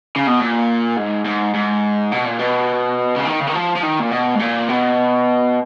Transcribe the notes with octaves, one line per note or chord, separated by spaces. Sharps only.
C#3
B2
A#2
G#2
G#2
G#2
B2
A#2
B2
C#3
D#3
C#3
D#3
F3
F3
D#3
A#2
B2
G#2
A#2
B2